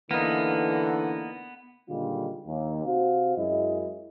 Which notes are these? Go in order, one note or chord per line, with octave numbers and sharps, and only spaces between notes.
D3 E3 A#3 B3 D#4
A#2 D3 D#3 G3 G#3 F4
D#2
C3 F#4 C5 F5
F#2 G#3 E4 D#5